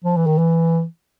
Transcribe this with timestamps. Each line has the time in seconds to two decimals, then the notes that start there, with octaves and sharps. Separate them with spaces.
0.04 F3
0.17 E3
0.27 D#3
0.38 E3